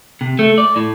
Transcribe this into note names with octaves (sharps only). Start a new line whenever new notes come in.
C3
A3
D5
A2